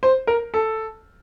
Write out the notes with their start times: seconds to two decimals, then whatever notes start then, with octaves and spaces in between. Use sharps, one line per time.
0.03 C5
0.27 A#4
0.54 A4